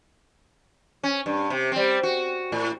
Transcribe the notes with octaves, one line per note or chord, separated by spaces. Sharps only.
C#4
G2
C3
G3 C4
F#4
A2